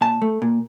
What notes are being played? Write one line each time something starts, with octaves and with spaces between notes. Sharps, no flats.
A#2 A5
A3
A#2